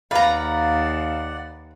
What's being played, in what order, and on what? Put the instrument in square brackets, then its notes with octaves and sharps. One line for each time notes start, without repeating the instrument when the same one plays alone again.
[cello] D#2 [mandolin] B4 A#5 [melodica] D5 F#5 [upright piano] F5